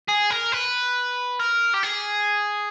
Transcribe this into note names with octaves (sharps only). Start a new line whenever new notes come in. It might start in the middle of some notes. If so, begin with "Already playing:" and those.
G#4
A#4
B4
A#4
G4
G#4